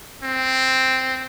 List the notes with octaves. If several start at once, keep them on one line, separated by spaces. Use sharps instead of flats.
C4